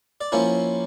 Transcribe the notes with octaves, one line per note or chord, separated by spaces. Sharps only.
D5
F3 A#3 C#4 E4 C#5